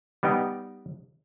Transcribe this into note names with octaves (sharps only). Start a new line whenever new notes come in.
G3 B3 D#4 G5